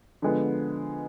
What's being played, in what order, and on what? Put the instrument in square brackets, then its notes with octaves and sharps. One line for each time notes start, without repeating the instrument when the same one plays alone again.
[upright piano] D3 F3 G#3 B3